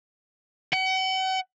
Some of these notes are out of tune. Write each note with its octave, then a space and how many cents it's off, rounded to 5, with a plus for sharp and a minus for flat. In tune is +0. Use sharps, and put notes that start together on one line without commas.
F#5 +40